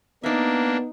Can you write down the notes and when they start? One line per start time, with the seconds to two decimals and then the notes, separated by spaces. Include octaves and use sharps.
0.23 A#3 B3 D4 D#4 E5